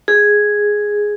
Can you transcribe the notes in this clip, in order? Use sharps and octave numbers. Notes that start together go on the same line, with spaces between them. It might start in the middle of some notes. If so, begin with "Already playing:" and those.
G#4